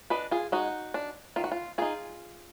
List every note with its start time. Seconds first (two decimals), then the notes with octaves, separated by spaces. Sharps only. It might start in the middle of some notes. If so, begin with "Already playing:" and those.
0.10 D4 B4 D#5
0.31 F4 G#4
0.52 G#3 D#4 F#4
0.94 D4
1.36 D#3 F4
1.44 F#4
1.52 F4
1.78 A#3 F4 G#4
1.82 D#4